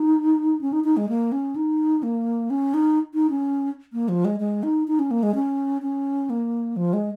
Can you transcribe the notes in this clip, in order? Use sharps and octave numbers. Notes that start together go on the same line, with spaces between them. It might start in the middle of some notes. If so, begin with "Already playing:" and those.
Already playing: D#4
C#4
D#4
D#4
G#3
A#3
C#4
D#4
A#3
C#4
D#4
D#4
C#4
A#3
F3
G#3
G#3
D#4
D#4
C#4
A#3
G#3
C#4
C#4
A#3
F3
G#3